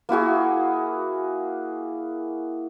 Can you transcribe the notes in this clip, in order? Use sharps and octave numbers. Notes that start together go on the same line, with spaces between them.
A#3 E4 F#4 G#4